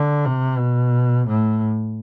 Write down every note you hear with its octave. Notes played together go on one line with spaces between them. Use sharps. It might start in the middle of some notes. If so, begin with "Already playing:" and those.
Already playing: D3
C3
B2
A2